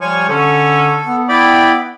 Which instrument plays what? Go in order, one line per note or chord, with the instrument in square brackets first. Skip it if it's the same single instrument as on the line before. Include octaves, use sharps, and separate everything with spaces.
[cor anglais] F3 [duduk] G3 [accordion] C#5 G#5 C#6
[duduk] D3 [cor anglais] C#4 [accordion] A4
[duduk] B3
[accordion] E4 G5 B5 [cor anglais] D5